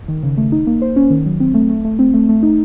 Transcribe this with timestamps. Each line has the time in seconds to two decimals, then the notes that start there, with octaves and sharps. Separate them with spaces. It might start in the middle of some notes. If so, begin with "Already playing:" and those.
0.08 D#3
0.23 C#3
0.38 A3
0.52 D#4
0.67 A#3
0.82 C5
0.96 C#4
1.10 D#3
1.26 F#3
1.40 C4
1.54 A3
1.69 A3
1.85 A3
1.99 C4
2.14 A3
2.29 A3
2.43 D#4